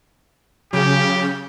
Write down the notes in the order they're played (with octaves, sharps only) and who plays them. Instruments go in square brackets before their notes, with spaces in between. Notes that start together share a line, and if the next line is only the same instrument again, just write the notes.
[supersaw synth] C#3 [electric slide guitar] F#3 G#4 [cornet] G4